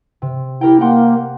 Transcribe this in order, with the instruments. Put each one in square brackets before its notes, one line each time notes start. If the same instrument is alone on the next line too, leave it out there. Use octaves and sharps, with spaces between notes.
[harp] C3
[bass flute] E4 [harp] G4 A#4 G5
[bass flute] A#3 [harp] F#5 G5 C6